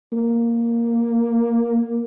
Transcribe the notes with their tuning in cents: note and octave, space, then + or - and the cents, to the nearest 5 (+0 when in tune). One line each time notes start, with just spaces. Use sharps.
A#3 +0